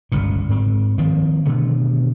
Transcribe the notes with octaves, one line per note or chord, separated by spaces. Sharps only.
G1 C#2 A#2
G#2 C4
D#3 F3 A#3 C4
B2 D3 D#3 A3